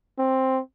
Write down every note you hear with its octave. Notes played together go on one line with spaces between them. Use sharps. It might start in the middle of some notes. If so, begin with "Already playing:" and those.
C4